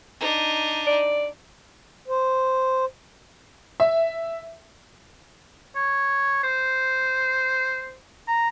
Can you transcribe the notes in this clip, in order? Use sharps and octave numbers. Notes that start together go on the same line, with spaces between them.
D4 D#4
D5
C5
E5
C#5
C5
A#5